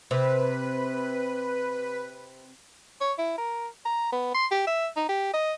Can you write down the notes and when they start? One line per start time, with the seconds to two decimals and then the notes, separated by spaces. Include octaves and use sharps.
0.11 C3 B4
3.01 C#5
3.18 E4
3.38 A#4
3.85 A#5
4.12 B3
4.34 C6
4.51 G4
4.67 E5
4.96 D#4
5.09 G4
5.34 D#5